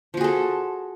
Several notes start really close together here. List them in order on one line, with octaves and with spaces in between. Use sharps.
F3 F#4 G#4 A4